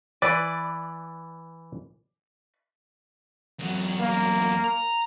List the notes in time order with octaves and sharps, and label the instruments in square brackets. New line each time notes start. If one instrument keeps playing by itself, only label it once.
[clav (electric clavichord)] E3 B4 [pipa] D5
[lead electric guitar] E2 F#3
[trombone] A#3
[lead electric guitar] A#5